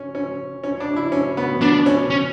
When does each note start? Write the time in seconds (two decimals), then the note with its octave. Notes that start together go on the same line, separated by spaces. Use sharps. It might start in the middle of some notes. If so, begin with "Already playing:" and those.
Already playing: C#4
0.15 C#4
0.64 C#4
0.80 D4
0.96 E4
1.12 C#4
1.37 B3
1.61 B3 D4
1.86 C#4
2.10 C#4